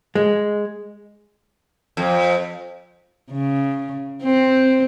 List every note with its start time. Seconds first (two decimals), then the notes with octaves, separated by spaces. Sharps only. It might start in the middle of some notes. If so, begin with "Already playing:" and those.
0.15 G#3
1.97 F2
3.31 C#3
4.23 C4